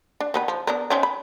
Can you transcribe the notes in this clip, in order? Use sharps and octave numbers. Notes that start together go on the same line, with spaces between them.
D4
D#3 B3 B5
F3
B3 D4 A#4
C4 C#4 D#4
B5